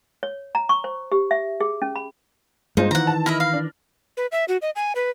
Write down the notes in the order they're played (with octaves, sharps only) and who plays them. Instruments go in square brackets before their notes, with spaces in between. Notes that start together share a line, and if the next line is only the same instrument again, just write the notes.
[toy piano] C#5
A#5
C#6
C5
G4
E5
G#4
C#4
B5
[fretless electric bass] G2 G#3 [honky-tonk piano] A#3 F4 C5 [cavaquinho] D#4
[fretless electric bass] D#3 E3 [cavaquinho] F#5 A#5
[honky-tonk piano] A5
[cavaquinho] E4 D#5 E5 [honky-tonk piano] B5 F6 A#6
[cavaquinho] F5
[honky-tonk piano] D4
[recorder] B4
E5
F#4
D#5
G#5
B4